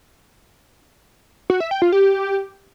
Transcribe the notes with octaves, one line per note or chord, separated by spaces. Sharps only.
F#4
E5
G5
F4
G4